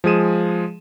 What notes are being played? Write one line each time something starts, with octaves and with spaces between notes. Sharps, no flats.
F3 G#3 G#4 D#7 E7